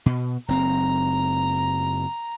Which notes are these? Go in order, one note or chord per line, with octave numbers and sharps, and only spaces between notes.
B2
F#1 C4 A#5